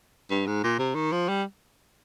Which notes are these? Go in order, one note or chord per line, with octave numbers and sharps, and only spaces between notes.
G2
G#2
A#2
C3
D#3
F3
G3